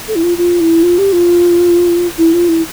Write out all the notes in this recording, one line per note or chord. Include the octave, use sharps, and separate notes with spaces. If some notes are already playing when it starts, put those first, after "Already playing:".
A4
E4
F4
F4
E4
F4
G4
F4
E4
F4
E4